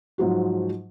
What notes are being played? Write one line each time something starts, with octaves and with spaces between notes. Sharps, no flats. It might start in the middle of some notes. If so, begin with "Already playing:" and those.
G#2 F3 F#3 F#4